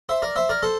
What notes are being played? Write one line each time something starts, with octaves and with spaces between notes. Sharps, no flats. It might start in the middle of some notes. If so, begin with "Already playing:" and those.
C5 E5
A#4 D5
C5 E5
A#4 D5
A4 C5